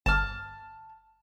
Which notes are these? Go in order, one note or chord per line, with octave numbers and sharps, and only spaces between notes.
G1 A5 F6